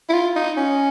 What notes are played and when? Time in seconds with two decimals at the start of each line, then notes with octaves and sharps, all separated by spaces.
0.09 E4
0.14 F4
0.36 D#4
0.57 C#4